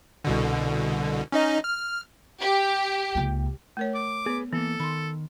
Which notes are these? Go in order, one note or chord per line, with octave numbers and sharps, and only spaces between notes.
C2 B2 D3
C#4 D#4 D#5
F6
G4
C#2 A#3
A3 A#4 C#5
D6
B3 G#4 B4
E3 A#3 B3 A4
D#3 B5 C6